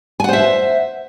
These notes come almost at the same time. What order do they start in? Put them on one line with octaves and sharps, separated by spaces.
G#5 F#5 C5 E5